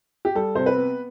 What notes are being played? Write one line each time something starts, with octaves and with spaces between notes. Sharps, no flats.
G4
G3 A4
C3 C5
B4
B3